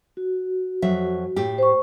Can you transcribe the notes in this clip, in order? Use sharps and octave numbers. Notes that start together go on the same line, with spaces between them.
F#4
F2 F#3 E5
A2 E4 G4
C5 C#6